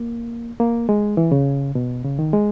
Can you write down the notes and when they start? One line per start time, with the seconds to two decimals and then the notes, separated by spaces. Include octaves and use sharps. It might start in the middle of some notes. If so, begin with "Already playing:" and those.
Already playing: A#3
0.60 A#3
0.89 G#3
1.17 E3
1.32 C#3
1.75 B2
2.05 C#3
2.19 D#3
2.33 G#3